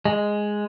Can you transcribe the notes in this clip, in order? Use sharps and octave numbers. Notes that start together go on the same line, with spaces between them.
G#3